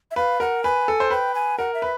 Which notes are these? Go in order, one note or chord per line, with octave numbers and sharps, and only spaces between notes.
E5
B4 F5
A#4 F#5
B4 G#5
A4
C5
B4 G5
G#5
A#4 F#5
E5
B4